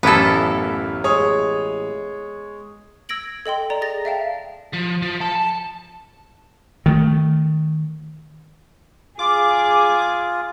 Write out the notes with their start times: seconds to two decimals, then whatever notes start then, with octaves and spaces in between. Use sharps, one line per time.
0.03 A1 F#2 A#3 B3 E4 A4
1.04 G#3 C#5 D#6
3.09 E6 G#6 A#6 D7 F#7
3.46 A4 D#5 G5 C6
3.70 D5 A#5
3.82 G#4 A6 A#6
4.05 E5 F5 G5 A5
4.73 F3
5.02 F3
5.21 A4
5.35 A5
6.86 D#3 A3
9.19 F4 G#4 D6